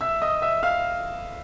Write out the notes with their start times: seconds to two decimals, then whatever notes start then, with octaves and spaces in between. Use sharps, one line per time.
0.01 E5 E6
0.22 D#5 D#6
0.42 E5 E6
0.63 F5 F6